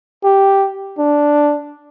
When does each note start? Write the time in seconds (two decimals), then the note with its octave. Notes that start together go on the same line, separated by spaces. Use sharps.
0.24 G4
0.98 D4